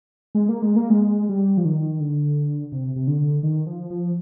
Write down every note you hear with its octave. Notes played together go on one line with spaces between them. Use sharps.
G#3
A#3
G#3
A#3
G#3
G3
F3
D#3
D3
C3
C3
D3
D#3
F3
F3